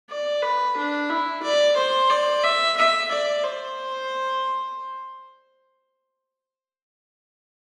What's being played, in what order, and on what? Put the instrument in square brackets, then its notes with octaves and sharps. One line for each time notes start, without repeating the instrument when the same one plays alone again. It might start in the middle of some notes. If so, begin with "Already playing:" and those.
[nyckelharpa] D5
B4
D4
E4
D5
C5
D5
E5
E5
D5
C5